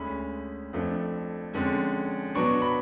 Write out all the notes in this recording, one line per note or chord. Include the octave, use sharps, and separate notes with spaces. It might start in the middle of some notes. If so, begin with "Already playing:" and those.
Already playing: D2 D3 G#3 C#4 B5
F2 F3 A3 D4
F2 D3 G#3 C#4
B2 F#3 B3 D4 C#6
B5